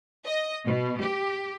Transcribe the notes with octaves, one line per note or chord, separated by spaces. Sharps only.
D#5
B2
G4